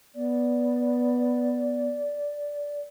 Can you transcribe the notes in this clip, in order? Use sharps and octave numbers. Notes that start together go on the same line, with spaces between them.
B3 D5